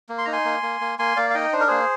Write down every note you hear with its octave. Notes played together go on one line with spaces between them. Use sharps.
A#3
C6
D#4 A#5
G#5 C6
A#3
A#3
A#3
A#3 G#5 C6
A#3 D5 F5
F5
D#4 D#5 G5
D4 C5
A#4
A#3 G#4 C5